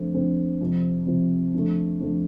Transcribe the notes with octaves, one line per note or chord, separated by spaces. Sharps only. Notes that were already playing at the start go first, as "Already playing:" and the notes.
Already playing: F2 D3 A3 C4
F2 D3 A3 C4
F2 C3 F3
F2 C3 F3
F2 D3 A3
F2 D3 A3